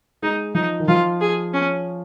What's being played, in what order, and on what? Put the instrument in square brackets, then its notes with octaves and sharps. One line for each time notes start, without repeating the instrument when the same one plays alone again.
[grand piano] G#3 [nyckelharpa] D#4
[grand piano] F3 [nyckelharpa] D#4
[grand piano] D#3
[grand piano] F3 [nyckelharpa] F4
[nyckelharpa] G#4
C#4